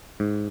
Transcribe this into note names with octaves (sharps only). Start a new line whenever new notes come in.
G#2